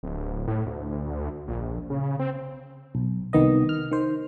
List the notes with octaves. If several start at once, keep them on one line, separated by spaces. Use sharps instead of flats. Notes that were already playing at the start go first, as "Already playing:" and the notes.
D1
A2
D2
A#1
C#3
C4
B1
C2 D#3 B3 D#5
F6
D#3 C5